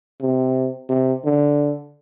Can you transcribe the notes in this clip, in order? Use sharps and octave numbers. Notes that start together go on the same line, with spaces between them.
C3
C3
D3